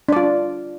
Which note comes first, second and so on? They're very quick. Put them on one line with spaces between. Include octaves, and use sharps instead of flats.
D4 D5 F4